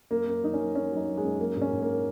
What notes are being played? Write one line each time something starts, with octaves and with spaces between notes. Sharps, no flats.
F#2 A#3
F#2
F#3 D#4
C#4
F#3
F#3 C#4
F#3 D#4
F#3
G#3
F#2
F#3 A#3
G#2
C#4
G#2
A#3